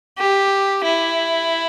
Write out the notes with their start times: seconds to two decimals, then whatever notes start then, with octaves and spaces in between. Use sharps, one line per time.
0.18 G4
0.85 E4